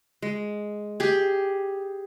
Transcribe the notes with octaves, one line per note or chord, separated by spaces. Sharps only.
G#3
G4 G#4